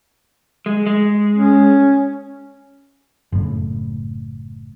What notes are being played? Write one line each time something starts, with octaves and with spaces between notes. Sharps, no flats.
G#3
G#3
C#4
F#1 A2